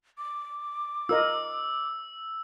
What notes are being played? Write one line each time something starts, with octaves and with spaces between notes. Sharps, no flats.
D6
F4 A#4 D#5 E6